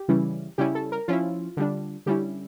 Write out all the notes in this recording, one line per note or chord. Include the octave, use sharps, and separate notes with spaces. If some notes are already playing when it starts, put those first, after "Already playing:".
Already playing: G4
C#3 E3 G3 C#4 E4
C#3 G3 C#4 E4 G4
A4
A#4
F3 C#4 E4 F4
D3 G3 D4
D3 G3 C#4 E4 G4